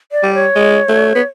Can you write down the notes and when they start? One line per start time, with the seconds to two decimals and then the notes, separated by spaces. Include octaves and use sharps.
0.12 D5
0.23 G3
0.34 C#5
0.56 G#3
0.89 A3
1.15 B3